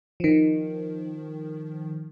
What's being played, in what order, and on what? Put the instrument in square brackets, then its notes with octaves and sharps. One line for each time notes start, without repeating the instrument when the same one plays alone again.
[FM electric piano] D#3 F3